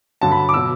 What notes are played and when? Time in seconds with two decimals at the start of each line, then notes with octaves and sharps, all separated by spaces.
0.22 G2 D3 F#3 A5
0.32 B5
0.49 D6
0.54 B2 F#3 E6